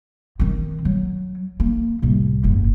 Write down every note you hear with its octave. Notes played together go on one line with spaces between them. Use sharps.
D#3 C4
F#3
A#3
C2 A2
F#1 G#2